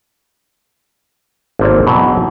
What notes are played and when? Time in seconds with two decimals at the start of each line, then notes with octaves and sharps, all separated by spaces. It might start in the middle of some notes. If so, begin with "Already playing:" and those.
1.59 G#1 A#3 C4 A4 C#5 D5
1.87 B2 E3 F#3